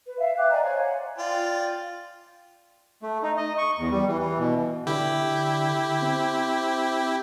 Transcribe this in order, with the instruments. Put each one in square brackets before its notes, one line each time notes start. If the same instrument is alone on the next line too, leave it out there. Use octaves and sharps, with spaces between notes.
[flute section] B4
E5 F5
G5 D6 F#6
D5 D#5 G#5 A#5
C5 C#5 F5 G#5
F#5
[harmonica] F4 D5 G5
[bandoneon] A3
D#4
D#5
C#6
E2
G3
E3
E3
B2
[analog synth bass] D3 [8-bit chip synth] E4 G4
[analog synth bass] C4